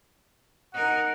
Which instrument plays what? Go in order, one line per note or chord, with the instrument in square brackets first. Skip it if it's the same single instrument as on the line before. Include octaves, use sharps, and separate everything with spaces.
[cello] D#4 A#4 [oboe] F#5